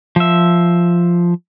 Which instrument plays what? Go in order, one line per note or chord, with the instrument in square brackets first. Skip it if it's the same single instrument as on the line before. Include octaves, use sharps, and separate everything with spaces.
[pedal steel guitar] F3 E5